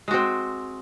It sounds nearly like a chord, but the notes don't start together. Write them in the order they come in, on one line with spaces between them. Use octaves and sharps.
G#3 F#4 C4